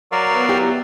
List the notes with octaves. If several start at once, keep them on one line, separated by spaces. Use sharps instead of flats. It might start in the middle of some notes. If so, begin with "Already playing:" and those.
F#3 A#4 D5 F5
B3
F#3 E4 G4 G5